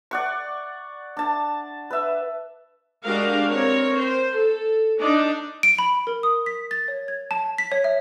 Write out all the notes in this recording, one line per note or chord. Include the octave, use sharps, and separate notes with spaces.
D5 F#5 C#6
D4 A5
B4 E5
G#3 D4 F#4 G4 A#4 F5
C4 A#4 C#5
C5
A4
D4 D#4 D5
D7
B5
A#4
D#6
B6
A6
C#5
G#6
A5
B6
C#5
E5